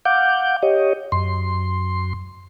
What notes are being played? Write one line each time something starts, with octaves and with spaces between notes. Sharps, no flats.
F5 F#5 D6 G6
G4 C#5 D#5
F#2 C6